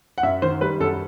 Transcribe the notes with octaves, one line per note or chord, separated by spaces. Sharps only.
F#5
F#2 E5
D#3 C5
G3 B4
F#2 A4